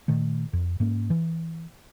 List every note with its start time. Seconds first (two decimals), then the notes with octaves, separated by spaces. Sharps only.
0.08 A#2 D#3 A3
0.53 F2
0.80 G#2 A#3 C#4
1.10 E3